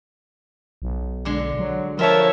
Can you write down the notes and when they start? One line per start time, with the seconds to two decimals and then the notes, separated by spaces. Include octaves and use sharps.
0.82 B1
1.25 D3 G#3
1.59 F#3
1.99 F3 A3 F4 A#4 C#5 E5 A5